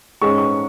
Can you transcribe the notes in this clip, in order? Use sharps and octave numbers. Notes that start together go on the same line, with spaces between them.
G#2 G#3 C#4 C#6
C#6